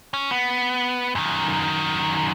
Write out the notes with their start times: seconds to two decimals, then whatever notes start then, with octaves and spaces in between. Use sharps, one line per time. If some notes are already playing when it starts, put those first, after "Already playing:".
0.14 C#4
0.31 B3
1.15 F#2 D#3